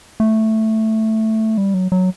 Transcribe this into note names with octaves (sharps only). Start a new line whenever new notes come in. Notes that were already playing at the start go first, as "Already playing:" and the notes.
A3
G3
F#3
F#3